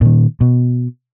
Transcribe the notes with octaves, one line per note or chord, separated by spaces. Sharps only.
A#2 D#3
B2